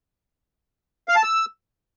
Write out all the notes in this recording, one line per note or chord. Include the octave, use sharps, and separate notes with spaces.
F5
A5
E6